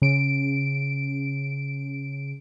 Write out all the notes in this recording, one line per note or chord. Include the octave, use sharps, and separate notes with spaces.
C#3 D7